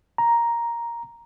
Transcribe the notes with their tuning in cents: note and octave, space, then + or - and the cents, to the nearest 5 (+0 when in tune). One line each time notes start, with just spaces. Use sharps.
A#5 +5